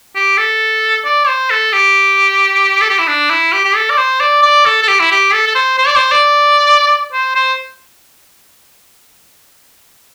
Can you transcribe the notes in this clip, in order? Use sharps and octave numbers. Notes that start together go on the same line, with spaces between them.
G4
A4
D5
C5
A4
G4
A4
G4
E4
D4
E4
G4
G4
A4
D5
C5
D5
D5
A4
A4
G4
E4
G4
A4
A4
C5
C5
D5
C5
D5
C5
C5